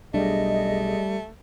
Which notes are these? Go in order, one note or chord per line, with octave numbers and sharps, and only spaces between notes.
B1 G3 A3 D4 G#4 D#5